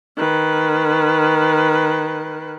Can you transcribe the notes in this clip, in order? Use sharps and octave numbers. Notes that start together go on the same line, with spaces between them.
D#3 B4